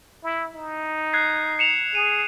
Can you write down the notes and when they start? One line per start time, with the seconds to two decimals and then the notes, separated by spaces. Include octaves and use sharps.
0.24 E4
0.55 D#4
1.13 F#6 G#6 C7
1.59 C#7 E7 F7
1.95 G#4 D#7